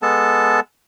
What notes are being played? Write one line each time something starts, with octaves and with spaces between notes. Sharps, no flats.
G#3 B3 A4 A5